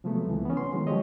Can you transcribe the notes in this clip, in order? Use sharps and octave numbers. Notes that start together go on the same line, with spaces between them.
C3 F3 F#3 G#3 A3 B3
C#2 E3
B3 C#4
C6
D#3 F#3 G#3
F3 G#3 G4 C#5 D#5